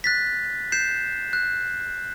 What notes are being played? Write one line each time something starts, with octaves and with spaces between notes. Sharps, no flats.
F#6 A6 B6
G6 C7 E7
F#6